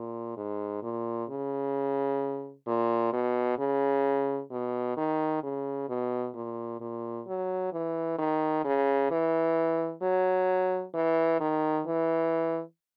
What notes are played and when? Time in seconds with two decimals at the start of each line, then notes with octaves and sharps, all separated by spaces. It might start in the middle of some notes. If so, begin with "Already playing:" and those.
Already playing: A#2
0.37 G#2
0.83 A#2
1.29 C#3
2.67 A#2
3.13 B2
3.58 C#3
4.51 B2
4.97 D#3
5.43 C#3
5.89 B2
6.35 A#2
6.80 A#2
7.27 F#3
7.73 E3
8.18 D#3
8.65 C#3
9.11 E3
10.02 F#3
10.94 E3
11.40 D#3
11.86 E3